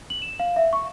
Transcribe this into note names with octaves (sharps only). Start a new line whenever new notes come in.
F#7
E7
F5
E5
C#6